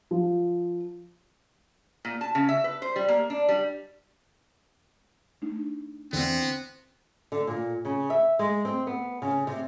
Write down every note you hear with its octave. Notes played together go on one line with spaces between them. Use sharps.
F3
A#2
A5
C#3
E5
B4
C5
G3
A#3
D4
G3
A3 D4 D#4
E2 D3 B3 C4
D3
A#2
C#3
E5
G#3
C4
B3
C#3
C3